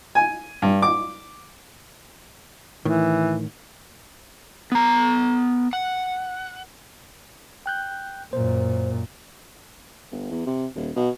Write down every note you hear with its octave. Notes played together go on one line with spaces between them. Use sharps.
G#5
G2
D6
A2 D#3 E3
B3 A#5
F#5
G5 F#6 G6
F#2 A#2 C5
G1
E2
C3
D#1
B2